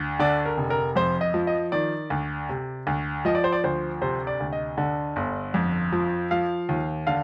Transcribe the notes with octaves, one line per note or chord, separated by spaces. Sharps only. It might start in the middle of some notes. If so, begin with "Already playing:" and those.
Already playing: D2
D3 D5
A#4
F1
A#4
F2 C5
D#5
F3
D#5
D#3 D5
D2
C3
D2
F3 D#5
D5
C5
D5
D2 C5
C3 C5
D5
D2
D#5
D3
G1
F2
F3
F3 F5
D#2
D3 F5